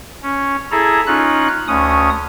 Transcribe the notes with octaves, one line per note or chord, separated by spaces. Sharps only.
C#4
E4 G#4 A4 A#5
C#4 D#4 F4 F#6
D2 C#4 D#6